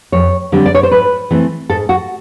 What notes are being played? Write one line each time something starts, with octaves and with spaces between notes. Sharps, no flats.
F2 C#5
D3 G3 C4
D5
C#5
C5
G#2 B4
E3 A3 C4
G#2 A4
F#4